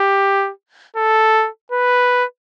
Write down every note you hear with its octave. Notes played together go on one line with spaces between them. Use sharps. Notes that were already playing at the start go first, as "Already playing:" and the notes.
Already playing: G4
A4
B4